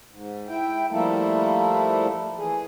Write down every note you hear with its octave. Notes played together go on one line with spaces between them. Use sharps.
G#2
E4 G5
F3 G3 A3 A#3 E4 A4
E3 G#4